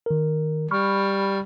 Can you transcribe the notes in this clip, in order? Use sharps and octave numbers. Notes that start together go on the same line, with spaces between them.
D#3 A#4
G3 B5 C#6 F6